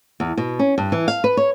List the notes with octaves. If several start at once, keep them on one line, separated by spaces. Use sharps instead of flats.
E2
B2
C#4
G2
E3
F5
B4
C#5